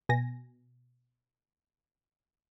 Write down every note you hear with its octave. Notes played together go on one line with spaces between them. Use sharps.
B2 G#5 A#6